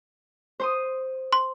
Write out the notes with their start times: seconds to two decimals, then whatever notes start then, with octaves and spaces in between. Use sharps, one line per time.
0.60 C5 C6 D#6
1.33 C6